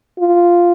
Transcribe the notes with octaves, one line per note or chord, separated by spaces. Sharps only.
F4